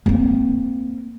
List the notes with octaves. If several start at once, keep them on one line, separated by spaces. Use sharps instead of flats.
A#3 C4